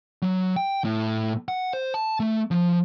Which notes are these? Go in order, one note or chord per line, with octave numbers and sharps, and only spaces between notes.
F#3
G5
A2
F#5
C5
A5
A3
F3